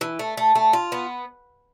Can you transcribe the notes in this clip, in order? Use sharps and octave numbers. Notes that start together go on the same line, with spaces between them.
E3
A3
A3
A3
F4
B3